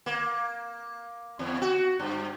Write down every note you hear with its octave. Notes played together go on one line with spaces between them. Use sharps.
A#3
E2
F#4
G2